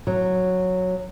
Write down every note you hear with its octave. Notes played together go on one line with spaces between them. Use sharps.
F#3